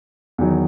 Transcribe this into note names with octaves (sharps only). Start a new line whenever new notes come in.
E2 D#3 F#3